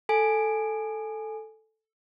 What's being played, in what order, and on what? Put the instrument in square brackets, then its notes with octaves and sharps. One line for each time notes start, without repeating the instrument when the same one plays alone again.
[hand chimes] A4 G#5 D7